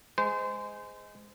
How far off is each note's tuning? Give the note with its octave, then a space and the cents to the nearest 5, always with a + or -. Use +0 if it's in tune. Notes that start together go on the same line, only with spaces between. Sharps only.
G#3 +0 C5 -25